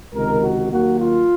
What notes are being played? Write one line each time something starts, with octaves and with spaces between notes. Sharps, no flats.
C#2 C3 D#3 A#4
F#4
D#2 D#3 F#3 A#3 F#4
F4